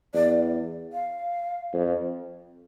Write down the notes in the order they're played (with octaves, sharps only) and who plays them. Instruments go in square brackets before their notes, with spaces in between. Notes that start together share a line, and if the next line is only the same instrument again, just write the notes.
[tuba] E2 [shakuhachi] D5
[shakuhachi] F5
[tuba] F2